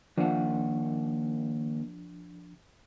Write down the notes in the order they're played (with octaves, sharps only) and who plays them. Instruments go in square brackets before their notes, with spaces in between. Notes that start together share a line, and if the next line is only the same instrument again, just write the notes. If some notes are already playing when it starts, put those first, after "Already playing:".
[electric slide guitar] D#3 A#3 F#5 [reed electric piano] F3 D4